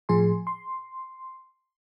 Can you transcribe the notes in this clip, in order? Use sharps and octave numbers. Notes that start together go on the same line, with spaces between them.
A2 F3 G#4 G#5 C6
C6